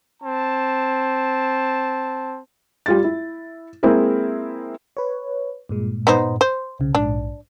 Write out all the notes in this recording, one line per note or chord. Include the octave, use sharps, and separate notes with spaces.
C4 A5
G3 F4 A6
E4
G#3 A#3 C4 E4 G#4 A#4
B4 C#5
G2 A#2 G#3
B3 D#4 C5
C5
C2 C#3
A#1 G#2 D4